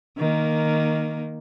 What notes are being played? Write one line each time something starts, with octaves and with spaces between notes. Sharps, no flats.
D#3 A#3